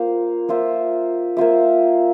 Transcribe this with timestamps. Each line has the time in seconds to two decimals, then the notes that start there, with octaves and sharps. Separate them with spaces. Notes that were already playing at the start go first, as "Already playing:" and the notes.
Already playing: A#3 F4 C5 F5
0.48 A#3 F4 C5 E5
1.37 A#3 F4 C5 E5